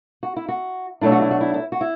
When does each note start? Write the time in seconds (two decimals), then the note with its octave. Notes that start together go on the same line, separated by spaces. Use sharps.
0.23 F#4
0.36 E4
0.48 F#4
1.01 B2 F#3 A3 D4 E4
1.12 F#4
1.22 E4
1.31 F#4
1.41 E4
1.54 E4
1.72 F#4
1.81 E4